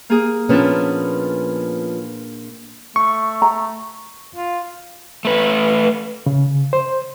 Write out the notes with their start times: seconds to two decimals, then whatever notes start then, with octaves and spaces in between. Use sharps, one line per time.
0.10 A#3 G#4
0.49 A#2 F3 B3 C#4 D4 B4
2.96 A3 C#6
3.42 A#5
4.36 F4
5.25 A3 B4
6.26 C#3
6.73 C5